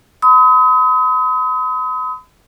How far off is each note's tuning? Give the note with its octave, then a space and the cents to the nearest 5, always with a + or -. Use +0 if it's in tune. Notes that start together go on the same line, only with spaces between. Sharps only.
B5 +45 D#6 +35